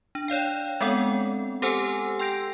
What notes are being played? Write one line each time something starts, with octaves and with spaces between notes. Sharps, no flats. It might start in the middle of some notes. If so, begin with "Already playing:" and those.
D4
C#5 D5 F5 G5
G#3 B3 C4 A4 F#5
G4 A4 C5 F#5 G#5 E6
G5 C6 E6 G6 A#6 D7